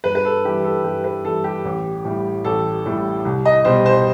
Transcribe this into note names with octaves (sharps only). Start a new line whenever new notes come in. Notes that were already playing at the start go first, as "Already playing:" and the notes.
G2 B4
B4
A4
E3 G3 G4
A4
G2 G4
B4
E3 G3 A4
G4
A1
A2 G3
A1 A4
A2 G3
C2
D#5
B2 G3 C5
C5